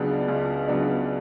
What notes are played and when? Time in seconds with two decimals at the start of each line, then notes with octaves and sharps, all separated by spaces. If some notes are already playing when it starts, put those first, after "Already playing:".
Already playing: C#2 C#3 F#3 B3 D4
0.28 C#2
0.68 C#3 F#3 B3 D4